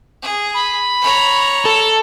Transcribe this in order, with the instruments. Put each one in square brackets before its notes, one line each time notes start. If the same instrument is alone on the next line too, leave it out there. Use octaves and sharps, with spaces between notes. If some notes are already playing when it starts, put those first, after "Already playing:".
[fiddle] G#4
[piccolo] B5
[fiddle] C#5 A#5
[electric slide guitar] A4